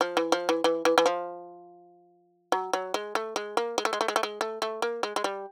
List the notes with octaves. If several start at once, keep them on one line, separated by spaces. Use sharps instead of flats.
F3
E3
F3
E3
E3
E3
E3
F3
F#3
F#3
G#3
A3
G#3
A#3
G#3
A3
G#3
A3
G#3
A3
G#3
A3
A3
A#3
G#3
G#3
G3